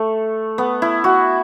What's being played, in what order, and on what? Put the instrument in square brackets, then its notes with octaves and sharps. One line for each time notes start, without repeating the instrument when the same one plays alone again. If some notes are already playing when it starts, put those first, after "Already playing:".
Already playing: [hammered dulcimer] A3
B3
E4
F#4